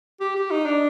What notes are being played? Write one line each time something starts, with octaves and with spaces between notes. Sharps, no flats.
G4
G4
D#4
D4